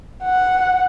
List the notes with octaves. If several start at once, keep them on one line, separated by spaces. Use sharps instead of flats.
F#5